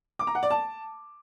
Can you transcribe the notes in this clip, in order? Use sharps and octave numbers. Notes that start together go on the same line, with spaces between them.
D6
A#5
F#5
D5
A5